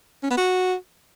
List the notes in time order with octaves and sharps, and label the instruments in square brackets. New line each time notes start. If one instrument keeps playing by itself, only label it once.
[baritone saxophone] C#4
B3
F#4